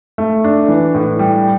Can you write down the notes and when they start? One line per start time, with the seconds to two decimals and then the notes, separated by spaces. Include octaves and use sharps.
0.18 A3
0.44 D4
0.68 E3
0.95 A2
1.19 G3